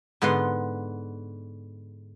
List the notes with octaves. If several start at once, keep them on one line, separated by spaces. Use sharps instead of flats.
G#2 D3 B3 F#5 C6